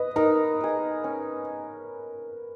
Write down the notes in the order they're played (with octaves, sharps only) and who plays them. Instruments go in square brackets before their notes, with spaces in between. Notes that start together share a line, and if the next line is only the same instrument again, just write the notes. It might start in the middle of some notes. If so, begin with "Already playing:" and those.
Already playing: [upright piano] B4 [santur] D#5
[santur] D#4 [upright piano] A#4
[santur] G#4 D#5
C#4